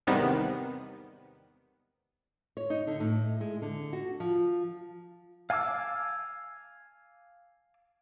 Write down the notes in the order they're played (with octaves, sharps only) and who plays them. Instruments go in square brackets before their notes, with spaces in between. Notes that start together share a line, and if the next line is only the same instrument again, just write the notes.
[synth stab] E2 G#2 C3 D#3 G3 B3
[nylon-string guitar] C#5
D#4
D3
A2
G#3
D3
F#4
F3
[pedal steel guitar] F5 G#5 A5 D6 E6